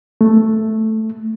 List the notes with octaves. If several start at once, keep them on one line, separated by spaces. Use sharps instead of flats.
A3